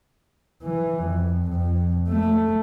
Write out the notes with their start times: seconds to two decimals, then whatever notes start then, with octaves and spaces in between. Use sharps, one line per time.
0.64 E3
1.03 F2
1.51 F2
2.09 A3